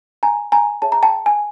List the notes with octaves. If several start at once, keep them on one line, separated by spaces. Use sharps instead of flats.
G#5 A#5
G#5 A#5
G#4 C#5 E5 A5
A#5
G5 A5
G#5